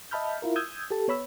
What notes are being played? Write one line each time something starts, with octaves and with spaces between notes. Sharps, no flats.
D#5 E5 A5 B5 F6 G6
E4 F4 A#4
D#6 E6 G6 G#6
G4 A4 A5
B3 C#5 B5 E6